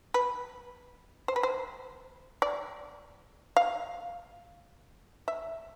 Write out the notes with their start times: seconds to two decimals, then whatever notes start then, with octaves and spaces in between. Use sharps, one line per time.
0.14 B4
1.28 C5
1.36 B4
1.43 C5
2.42 D5
3.57 F5
5.28 E5